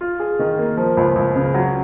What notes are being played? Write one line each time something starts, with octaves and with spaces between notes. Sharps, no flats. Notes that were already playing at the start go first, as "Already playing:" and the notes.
F4
G#4
D#3
A#3
F3
C#2
C#2
C#3
F#3